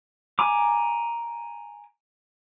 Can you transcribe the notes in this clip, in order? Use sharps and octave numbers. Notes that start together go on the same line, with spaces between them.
G#5 A#5 D6